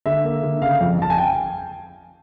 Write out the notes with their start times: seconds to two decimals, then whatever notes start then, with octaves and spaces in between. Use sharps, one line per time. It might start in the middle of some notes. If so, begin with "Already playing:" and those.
0.06 D3 E5
0.24 A#3
0.43 D3
0.62 C#3 F5
0.81 F2
0.99 F2 A5
1.10 G#5
1.18 G5